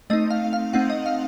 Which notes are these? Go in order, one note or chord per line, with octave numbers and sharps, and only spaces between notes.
A3 C4 D#4 D#5
F5
F5
A3 C4 D#4 F#5
D#5
F5